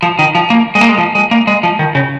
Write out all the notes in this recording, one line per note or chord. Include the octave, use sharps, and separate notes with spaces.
F3
D#3
F3
A#3
G#3
A#3
G#3
F3
G#3
A#3
G#3
F3
D#3
C#3